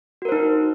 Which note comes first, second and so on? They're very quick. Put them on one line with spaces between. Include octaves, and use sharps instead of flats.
F#4 A#4 C5 D#4